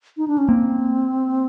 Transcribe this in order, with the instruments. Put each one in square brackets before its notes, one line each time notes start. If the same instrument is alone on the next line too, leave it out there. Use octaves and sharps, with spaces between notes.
[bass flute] D#4
D4
C#4
[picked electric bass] A#3 [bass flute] C4